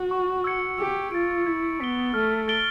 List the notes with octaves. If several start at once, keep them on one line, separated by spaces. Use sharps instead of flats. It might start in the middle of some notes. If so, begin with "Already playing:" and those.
Already playing: F#4
C#6
E6 G#6 C#7
G4 E6
F4 A6 D7
E4 G#6
B3 B6 D7 G7
A3 F6
A6 D7 G7